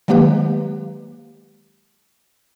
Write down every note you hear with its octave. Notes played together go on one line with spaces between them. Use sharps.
D#3 F#3 G#3 A#3 G4 B4